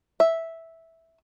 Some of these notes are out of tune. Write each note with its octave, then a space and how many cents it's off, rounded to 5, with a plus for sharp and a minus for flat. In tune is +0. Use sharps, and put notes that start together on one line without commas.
E5 -5